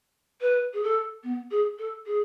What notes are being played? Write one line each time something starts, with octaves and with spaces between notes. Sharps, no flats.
B4
G#4
A4
B3
G#4
A4
G#4